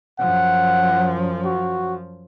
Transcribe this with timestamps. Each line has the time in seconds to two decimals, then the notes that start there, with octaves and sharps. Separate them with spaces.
0.19 F#2 F3 F#5
1.45 F#4